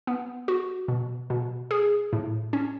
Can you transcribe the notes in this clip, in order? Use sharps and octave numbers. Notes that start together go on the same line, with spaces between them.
B3
F#4
B2
B2
G#4
A2
C#4